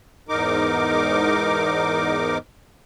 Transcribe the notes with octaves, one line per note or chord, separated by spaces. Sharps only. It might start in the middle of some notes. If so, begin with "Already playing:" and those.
E2 G#2 D#4 A#4 D6